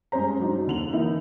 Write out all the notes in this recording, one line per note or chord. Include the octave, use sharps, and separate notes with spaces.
G2 G#3 C#4 C5 A#5
F#3 D4 D#4
D#2 D3 F7 F#7
E3 A#3 D#4 E4